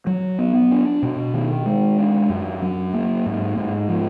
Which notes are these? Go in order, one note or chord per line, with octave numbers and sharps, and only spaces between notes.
F#3
B3
D4
B2
D#3
G#3
D4
F#2
F#3
A#3
G#2
G#2
F3